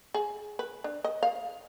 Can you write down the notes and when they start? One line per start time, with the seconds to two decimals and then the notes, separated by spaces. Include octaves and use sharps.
0.14 G#4
0.59 B4
0.84 D4
1.04 D#5
1.23 F5